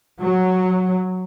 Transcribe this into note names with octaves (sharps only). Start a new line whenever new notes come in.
F#3